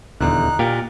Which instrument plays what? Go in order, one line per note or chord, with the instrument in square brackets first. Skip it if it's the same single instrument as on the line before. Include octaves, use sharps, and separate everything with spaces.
[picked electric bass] D#1 E2 [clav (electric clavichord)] D3 [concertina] D#4 F#6
[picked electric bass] A#2 [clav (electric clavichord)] G4 F5 G5 [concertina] A#4